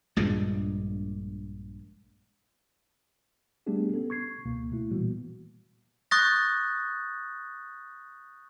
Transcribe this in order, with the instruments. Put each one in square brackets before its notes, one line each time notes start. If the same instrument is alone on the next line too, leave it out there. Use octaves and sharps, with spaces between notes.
[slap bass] A#1 G2 A#2 G#3
[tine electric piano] G3 A3 B3 D4 G4 G#4
B3 C#4 A4
C#6 G#6 C7
C#2 B2 A#3
B2 A3 E4
A#2 E3 G3 A#3 B3 F#4
[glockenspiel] C#6 D#6 F#6 G6 A6 A#6